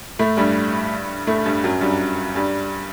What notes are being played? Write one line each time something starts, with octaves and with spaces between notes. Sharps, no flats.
A2 A3
G2 G3
A2 A3
G2 G3
F#2 F#3
G2 G3
G2 G3